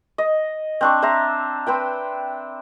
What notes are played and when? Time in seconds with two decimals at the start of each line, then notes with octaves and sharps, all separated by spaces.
0.18 D#5
0.81 C4 D4 C#6
1.02 C5 E5 A#5
1.67 C4 B4 G5